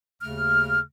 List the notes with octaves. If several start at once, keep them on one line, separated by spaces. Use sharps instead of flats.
D#2 C#3 A3 F6